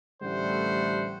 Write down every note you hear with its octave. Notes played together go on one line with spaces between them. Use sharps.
A1 D3 G3 A3 C5 F#5